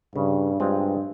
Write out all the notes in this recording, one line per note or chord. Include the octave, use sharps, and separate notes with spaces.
G2 C#3
G2 G#3 C4 F4